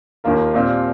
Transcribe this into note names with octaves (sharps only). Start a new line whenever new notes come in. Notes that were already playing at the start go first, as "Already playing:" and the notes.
D#2 D#3 A#3 F4 A#4
A#2 G3 C4 F4